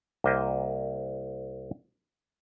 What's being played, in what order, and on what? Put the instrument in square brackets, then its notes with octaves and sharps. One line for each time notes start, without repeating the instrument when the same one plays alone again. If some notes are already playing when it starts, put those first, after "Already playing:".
[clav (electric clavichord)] C2 A#3 C5 D#5 E5 G5